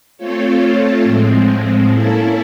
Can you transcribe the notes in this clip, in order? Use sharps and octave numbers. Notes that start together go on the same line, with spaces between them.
A3 C4 F4 A4 C#5
A2 F3 G#3 C4
A#3 C#4 E4 A4